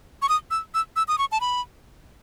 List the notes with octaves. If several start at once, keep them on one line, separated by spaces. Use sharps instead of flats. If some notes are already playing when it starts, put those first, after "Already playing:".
C#6
D#6
E6
E6
E6
D#6
C#6
A5
B5